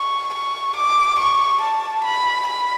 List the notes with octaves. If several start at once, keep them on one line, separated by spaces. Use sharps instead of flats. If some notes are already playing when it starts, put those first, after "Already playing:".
Already playing: C#6
C#6
D6
C#6
A5
B5
B5